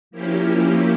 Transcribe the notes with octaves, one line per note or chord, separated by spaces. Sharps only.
F3 A#3 C#4 E4 G4